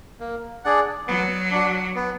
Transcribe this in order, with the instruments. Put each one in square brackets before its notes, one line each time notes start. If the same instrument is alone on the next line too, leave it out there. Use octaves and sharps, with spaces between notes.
[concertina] A#3
D4 G#4 D5 F#5
[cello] F#3 [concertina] B3
[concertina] D4 F#4
B3